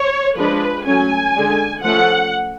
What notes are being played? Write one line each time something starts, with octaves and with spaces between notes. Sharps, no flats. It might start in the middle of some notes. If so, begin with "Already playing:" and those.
Already playing: C#5
F3 G#3 D4 B4
F#3 A3 C#4 G#5
D3 G#3 D4
F3 A3 C#4 F#5